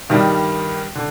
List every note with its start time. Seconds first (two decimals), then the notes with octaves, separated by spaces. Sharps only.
0.09 G2 D#3 G3
0.95 D3